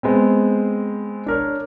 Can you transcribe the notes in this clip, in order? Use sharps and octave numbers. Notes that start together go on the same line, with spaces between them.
G#3 B3 C4
D4 A#4 C#5